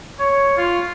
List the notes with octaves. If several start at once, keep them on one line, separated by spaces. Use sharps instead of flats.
C#5
F4